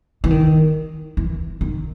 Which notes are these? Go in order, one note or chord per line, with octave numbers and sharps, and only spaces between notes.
E3
D#3
E3
D#3